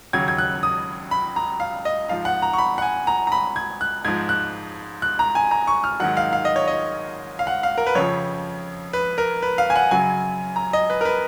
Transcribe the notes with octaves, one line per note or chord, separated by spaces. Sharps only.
D#2 C#3 F#3 G#6
G#6
F#6
D#6
B5
A#5
F5
D#5
G#2 F3 F5
F#5
A#5
C#6
B5
F#5
G#5
A#5
A#5
B5
G#6
F#6
G#2 F3 G#6
F#6
F#6
A#5
G#5
A#5
C#6
F6
G#2 D#3 F#3 F#5
F5
F5
D#5
C#5
D#5
F5
F#5
F5
A#4
B4
F2 C#3 F3 C#5
B4
A#4
B4
F5
G#5
F#5
F#2 C#3 F#3 G#5
A#5
D#5
B4
A#4
B4